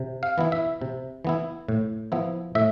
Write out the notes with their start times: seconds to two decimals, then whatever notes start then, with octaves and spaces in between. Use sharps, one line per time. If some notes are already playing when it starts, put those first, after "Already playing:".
Already playing: C3
0.23 F5
0.38 E3 B3 E4
0.52 E5
0.81 C3
1.25 E3 B3 E4
1.68 A2
2.12 F3 B3 E4
2.55 A2 E5